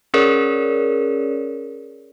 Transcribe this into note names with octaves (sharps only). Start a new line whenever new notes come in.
C#4 G#4 A#4 C#5 D5